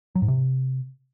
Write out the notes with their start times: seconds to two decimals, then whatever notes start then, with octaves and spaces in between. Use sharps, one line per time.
0.15 F#3
0.22 G#2
0.28 C3